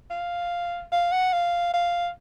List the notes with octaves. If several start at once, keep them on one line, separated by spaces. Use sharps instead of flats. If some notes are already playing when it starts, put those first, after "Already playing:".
F5
F5
F#5
F5
F5